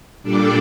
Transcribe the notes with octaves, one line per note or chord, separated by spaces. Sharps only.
A#2 G3 D4 A4 D5